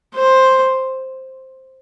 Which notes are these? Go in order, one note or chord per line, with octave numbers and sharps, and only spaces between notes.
C5